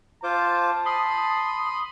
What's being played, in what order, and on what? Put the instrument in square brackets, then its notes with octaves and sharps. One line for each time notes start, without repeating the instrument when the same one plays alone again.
[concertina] F4 C5 D6 [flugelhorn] A5
[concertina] B5 C6 [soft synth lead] D#6